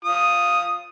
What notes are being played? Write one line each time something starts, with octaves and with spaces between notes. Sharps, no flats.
F4 D#6